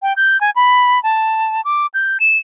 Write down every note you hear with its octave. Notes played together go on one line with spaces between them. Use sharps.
G5
G6
G#5
B5
A5
D6
G6
E7